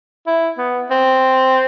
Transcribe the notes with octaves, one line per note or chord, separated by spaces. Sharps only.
E4
B3
C4